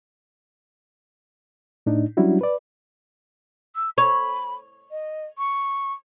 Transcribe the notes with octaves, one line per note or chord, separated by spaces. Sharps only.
A2 D4 D#4
F#3 G3 C#4 D4 E4 F#4
B4 D5
E6
C#5 B5
D#5
C#6